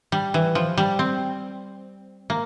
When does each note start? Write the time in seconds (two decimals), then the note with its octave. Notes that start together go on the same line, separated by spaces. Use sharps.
0.12 G3
0.34 E3
0.55 F3
0.78 G3
0.99 C4
2.30 A#3